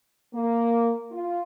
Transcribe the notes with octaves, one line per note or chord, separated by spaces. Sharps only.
A#3
F4